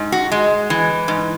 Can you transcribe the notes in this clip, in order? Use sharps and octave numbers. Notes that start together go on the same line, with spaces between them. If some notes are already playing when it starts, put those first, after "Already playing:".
Already playing: G#2
F#4
G#3
E3
G#2